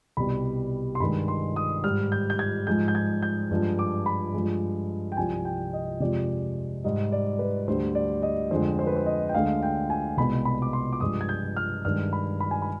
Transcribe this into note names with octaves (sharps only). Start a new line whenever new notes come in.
C2 B2 G3 B5
C6
G2 D#3 G#3 B5
C6
D#6
G#2 G3 F6
G6
G6
G#6
G#2 F3 G#3 G6
G6
G#6
G6
G2 F3 G#3
D6
B5
G2 F3 G#3
G5
C2 C3 F3 G#5
G5
D#5
F2 C3 F3 G#3 D5
G#2 G3 D#5
D5
B4
D2 D3 G3 C5
D5
D#5
F2 D3 G#3 C5
C5
B4
C5
D#5
G5
D2 D3 G#3 F5
G5
G#5
C2 B2 G#3 B5
B5
D6
C6
D6
G2 F3 G#3 D#6
G#6
G6
F6
G2 D#3 G#3 F6
B5
B5
G#5
B5